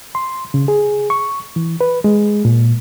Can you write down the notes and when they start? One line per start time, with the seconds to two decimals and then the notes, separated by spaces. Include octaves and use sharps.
0.15 C6
0.54 C#3
0.68 G#4
1.10 C#6
1.56 E3
1.81 B4
2.04 G#3
2.45 A#2